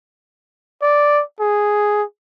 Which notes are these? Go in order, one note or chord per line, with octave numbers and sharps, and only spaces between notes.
D5
G#4